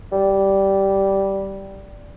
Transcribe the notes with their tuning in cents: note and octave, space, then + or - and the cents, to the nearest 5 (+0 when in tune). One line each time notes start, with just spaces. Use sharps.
G3 -10